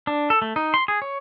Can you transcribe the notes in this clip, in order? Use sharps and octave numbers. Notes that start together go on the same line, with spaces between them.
D4
A4
A3
D#4
C6
G#4
C#5